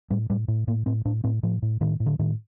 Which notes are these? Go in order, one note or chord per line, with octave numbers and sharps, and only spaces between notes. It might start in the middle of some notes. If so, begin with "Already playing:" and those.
A2 G3
A2 G3
A2
A2 A#3
A2 C4
A2 D4
A2 C4
A2 F3
A2
A2 D#3
A2
D3
A2 D#3